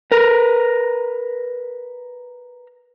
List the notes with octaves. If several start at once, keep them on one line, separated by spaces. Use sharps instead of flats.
A#4 B4